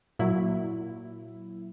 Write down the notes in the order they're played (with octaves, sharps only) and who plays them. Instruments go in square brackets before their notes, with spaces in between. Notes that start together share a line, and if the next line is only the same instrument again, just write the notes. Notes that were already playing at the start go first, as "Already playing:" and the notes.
[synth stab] A#2 F#3 E4